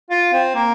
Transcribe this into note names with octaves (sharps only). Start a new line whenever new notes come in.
F4
C4
A#3